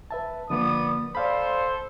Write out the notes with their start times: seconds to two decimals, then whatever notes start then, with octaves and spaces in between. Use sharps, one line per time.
0.11 B4 E5 A5
0.50 D3 F3 A#3 B3 D5 D#6
1.15 A4 C5 D5 F5 B5